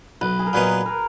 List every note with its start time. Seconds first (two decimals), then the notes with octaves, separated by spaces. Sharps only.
0.21 B1 B4
0.39 G#4
0.47 A#4
0.53 A#2 F#3 B3 D#4 B4
0.86 A#4